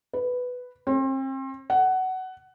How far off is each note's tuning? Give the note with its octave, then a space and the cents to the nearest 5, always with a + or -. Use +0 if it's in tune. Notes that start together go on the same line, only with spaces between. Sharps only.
B4 +5
C4 +35
F#5 +15